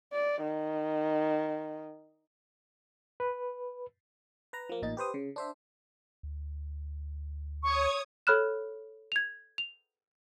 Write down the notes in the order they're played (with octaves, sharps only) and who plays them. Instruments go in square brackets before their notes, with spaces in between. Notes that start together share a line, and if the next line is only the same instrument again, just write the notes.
[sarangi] D5
D#3
[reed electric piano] B4
[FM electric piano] B4 A#5
F3 A#3
A1 A#2 D#4 A6
G4 B4 C5 D#6
C#3
D4 C5 E5
[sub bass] D2
[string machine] C#5 D#6 G#6 [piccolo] C#6
[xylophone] A4 C#5 B5 F6 F#6 E7
G#6 F7
F7